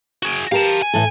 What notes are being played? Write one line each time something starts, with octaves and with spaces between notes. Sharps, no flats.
F#4 G#4
G4 A#4 F5 A5
G#5
A2 E3 A4